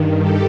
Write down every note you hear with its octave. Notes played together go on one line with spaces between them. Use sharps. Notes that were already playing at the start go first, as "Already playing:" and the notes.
Already playing: G2 D#3
G4 A4